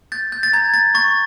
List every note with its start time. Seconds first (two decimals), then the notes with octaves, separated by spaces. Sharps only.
0.12 G6 A6
0.32 G6
0.43 A6
0.53 A#5 G#6
0.74 A6
0.95 C#6 A6